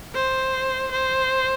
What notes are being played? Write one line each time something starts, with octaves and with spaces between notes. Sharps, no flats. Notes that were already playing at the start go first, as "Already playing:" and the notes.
C5
C5